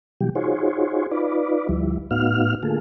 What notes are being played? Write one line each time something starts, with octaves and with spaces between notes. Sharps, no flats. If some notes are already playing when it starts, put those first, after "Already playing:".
B2 E3 F#3 G3 G4
D#4 F4 F#4 G#4 C5 C#5
D#4 F4 B4 D5
D2 F3 G3 E4
A2 B3 D#4 F#4 F5 F6
D3 A3 A#3 F4 G#4 A4